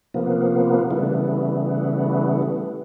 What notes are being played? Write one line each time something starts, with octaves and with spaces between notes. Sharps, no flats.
C3 F3 A#3 B3
C#3 E3 G3 A3 B3